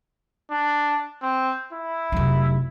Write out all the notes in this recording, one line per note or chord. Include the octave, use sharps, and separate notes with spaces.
D4
C4
E4
F1 F#3